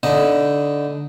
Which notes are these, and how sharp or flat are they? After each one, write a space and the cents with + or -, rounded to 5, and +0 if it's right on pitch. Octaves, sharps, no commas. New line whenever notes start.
D3 -15 D#4 +0 B4 +0